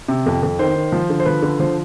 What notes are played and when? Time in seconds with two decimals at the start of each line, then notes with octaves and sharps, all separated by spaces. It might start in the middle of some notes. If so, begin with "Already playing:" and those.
0.08 C3
0.26 F2
0.43 F2
0.59 D#3 C5
0.76 D#3
0.92 F3
1.10 D3
1.20 C5
1.26 F3 B4
1.42 D3
1.60 F3 C5